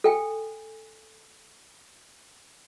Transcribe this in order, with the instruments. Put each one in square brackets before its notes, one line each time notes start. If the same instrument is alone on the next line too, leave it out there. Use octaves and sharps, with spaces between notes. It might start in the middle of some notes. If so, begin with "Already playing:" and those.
[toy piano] A4 G5 G#5